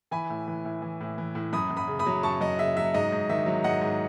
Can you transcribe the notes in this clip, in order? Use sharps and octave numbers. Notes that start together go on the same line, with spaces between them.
E3 G#5 B5
A2
E3
A2
E3
A2
E3
A2
F#2 B5 D#6
F#2
B5 D#6
C#3
B5 D#6
F#3
F#2 A5 C#6
F#2 D#5
C#3 E5
F#3 E5
G#2 D#5
G#2
D#3 E5
F#3
G#2 D#5 F#5
G#2